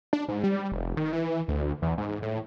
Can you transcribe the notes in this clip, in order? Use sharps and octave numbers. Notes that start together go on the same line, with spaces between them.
D4
G#2
G3
F1
D#3
E3
D2
E2
G#2
A2